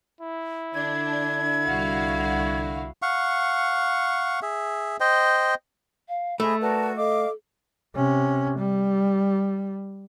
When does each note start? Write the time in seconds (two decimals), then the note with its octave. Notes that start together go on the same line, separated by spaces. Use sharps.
0.21 E4
0.75 D3 D4 G#6
1.64 C2 F#4 F5
3.02 F5 F#5 C#6
4.42 G#4 E5
5.00 C5 D#5 G5
6.08 F5
6.40 A3 G#4 C5 D#5 E5 B5
6.61 F#4 A#4 B4 D5 A5
6.96 A4 D#5 F5 D6
7.96 C3 C#4
8.58 G3